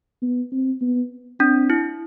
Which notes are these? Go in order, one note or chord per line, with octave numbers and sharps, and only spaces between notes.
B3
C4
B3
C4 D4
E4